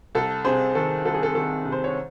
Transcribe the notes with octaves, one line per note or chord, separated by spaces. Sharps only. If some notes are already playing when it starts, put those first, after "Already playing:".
C2 A4
C3 G#4 C5
D#3 A4
C2 A4
G#4
A4
D#3 A4
C3
C5
C#5